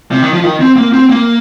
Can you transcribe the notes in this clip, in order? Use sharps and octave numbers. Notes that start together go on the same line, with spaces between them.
C3
D#3
F3
D#3
C4
A#3
C4
A#3